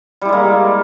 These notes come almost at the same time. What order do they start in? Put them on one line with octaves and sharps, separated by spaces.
G3 E4 G#3 A#3